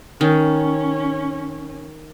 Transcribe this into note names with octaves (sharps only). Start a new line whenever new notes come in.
D#3 C#4